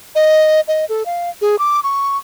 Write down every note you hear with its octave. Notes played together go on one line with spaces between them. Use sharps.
D#5
D#5
A4
F5
G#4
D6
C#6